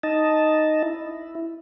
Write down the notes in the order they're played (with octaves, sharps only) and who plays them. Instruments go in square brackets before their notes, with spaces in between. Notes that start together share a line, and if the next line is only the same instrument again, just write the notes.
[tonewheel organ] D#4 D#5 A5
E4